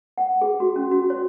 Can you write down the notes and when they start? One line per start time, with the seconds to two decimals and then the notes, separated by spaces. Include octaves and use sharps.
0.18 F#5
0.41 G#4
0.60 F#4
0.76 C#4
0.91 F#4
1.10 C#5